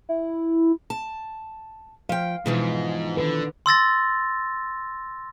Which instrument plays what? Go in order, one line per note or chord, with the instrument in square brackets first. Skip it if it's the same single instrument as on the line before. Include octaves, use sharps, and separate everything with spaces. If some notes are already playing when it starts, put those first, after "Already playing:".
[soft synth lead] E4
[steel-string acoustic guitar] A5
[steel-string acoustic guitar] F3 G5 [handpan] F5
[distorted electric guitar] G#2 [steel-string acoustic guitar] B2 E3 F3
[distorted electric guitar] D3 [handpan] D#3 B4
[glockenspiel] C6 E6 A6 A#6